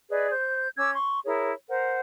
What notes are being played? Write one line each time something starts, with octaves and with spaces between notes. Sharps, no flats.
G#4 B4 D5 D#5
C5 G6
C#4 D6 E6 G#6
C6 C#6
E4 G#4 A#4 C#5
A#4 C5 F#5